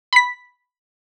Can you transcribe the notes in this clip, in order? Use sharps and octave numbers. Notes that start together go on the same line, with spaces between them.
B5 B6